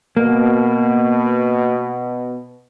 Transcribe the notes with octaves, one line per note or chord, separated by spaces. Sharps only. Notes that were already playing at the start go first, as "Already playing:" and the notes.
B2 A#3